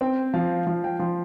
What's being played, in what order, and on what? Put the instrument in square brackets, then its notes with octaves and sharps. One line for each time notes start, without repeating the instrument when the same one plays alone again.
[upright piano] C4 [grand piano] G5
[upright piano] F3 [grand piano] F5
[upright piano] F3 [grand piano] F5
[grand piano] G5
[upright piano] F3 [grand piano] C6